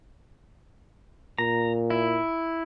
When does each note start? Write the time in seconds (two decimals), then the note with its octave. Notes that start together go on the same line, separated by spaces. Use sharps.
1.38 A#2 A#5
1.90 E4